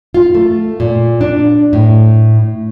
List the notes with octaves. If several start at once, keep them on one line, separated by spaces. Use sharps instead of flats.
F4
A3
A#2
D4
A2